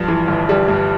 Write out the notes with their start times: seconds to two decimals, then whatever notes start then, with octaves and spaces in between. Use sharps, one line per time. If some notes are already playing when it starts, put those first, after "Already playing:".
Already playing: G2 F3
0.08 E3
0.28 G1
0.49 G3
0.68 G2